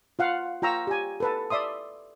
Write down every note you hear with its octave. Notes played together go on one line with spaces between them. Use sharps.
F4 F5 F#5
F4 G5 A#5 C#6 E6
G4 G#5
A4 B4 A5
D5 E5 C6 D#6